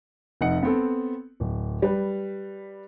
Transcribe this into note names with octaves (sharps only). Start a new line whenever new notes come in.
F1 D#4 F#5 C#7
B3 C4 A4
D1
G3 B4